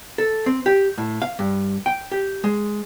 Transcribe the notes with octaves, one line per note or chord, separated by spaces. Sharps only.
A4
C4
G4
A2
F5
G2
G5
G4
G#3